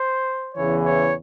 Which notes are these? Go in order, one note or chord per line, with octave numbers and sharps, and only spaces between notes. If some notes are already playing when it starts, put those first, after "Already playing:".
Already playing: C5
E2 C#3 E3 C#5
C#5